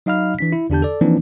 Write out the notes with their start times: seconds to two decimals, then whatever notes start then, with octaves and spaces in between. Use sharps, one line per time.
0.06 F#3 D#4 D#5 F5 B5 F6
0.39 E3 D4 B6
0.52 E4
0.70 E2 D3 D4 G4 A5 G6
0.82 A4 D5
1.01 E3 F3 A#3 C4 D4 D#4